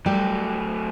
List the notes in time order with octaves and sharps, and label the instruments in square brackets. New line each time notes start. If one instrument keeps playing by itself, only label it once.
[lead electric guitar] F#3 A3 [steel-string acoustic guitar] G3 F#4 G4